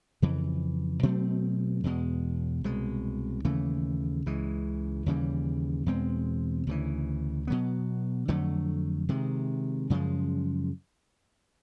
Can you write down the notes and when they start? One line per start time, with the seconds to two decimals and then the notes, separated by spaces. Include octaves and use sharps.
0.22 F2 C#3 E3
1.03 B2 F#3 A3 C4
1.84 E2 B2 G#3
2.64 C2 B2 G#3
3.45 D#2 C#3 E3 A3
4.26 C#2 C#3 E3 G#3
5.06 D#2 C#3 E3 G3
5.86 E2 B2 G#3 C4
6.67 D2 C#3 E3
7.47 B2 F#3 B3
8.28 F2 D3 F#3 A3
9.09 C3 D#3 G#3
9.90 F#2 C#3 F3 G#3